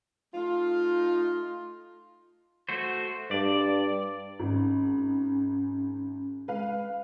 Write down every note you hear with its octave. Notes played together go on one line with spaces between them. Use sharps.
A3 D#4 F4
A3 F#4 C5
G2 D5
G#1 C#4
G#3 B4 F5